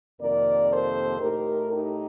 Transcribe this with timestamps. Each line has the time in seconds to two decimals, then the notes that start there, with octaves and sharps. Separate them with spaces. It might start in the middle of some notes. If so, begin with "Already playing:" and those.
0.20 F2 C3 D#3 A#3 A#4 D5
0.71 A4 C5
1.20 A2 A3 D#4 G4 A#4
1.71 D#4 G4